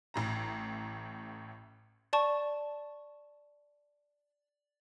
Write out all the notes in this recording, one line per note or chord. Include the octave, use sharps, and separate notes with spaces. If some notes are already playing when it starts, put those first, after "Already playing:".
A1 A2 A#5
D5 A5 C#6